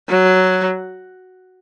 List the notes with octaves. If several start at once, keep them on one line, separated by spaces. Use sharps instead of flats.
F#3